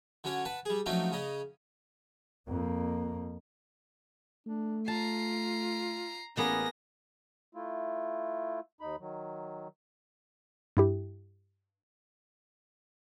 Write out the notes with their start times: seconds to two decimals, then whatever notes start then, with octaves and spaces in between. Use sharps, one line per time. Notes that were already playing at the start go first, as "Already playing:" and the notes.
0.24 D3 F#3 C#4 C#5
0.45 B4 F#5 A5
0.65 G3 G#4
0.86 F3 F#3 A3 C4 C#4 D#4
1.12 C#3 C#4 D#5
2.48 F2 A#3
4.47 A3 D4
4.88 F4 A5 A#5 C7
6.37 A1 A#3 B3 C#4 G#4 A#6
7.55 A3 E4 F4
8.81 D#2 D#4 B5
9.00 D#3 F#3
10.77 G2 E4 G4